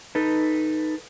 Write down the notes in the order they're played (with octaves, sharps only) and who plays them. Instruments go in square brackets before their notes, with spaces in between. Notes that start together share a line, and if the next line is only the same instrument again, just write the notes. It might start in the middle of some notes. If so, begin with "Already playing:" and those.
[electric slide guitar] D#4 A4 B4